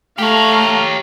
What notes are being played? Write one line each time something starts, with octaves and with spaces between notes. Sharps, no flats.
A3 G4 C#5 F5 A#5